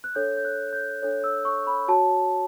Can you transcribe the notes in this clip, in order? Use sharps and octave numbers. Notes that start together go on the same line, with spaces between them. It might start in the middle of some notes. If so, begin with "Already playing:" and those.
F#6
D4 A4 C#5 G6
G6
F#6
G6
D4 A4 C#5
E6
C#6
B5
F#4 C#5 A5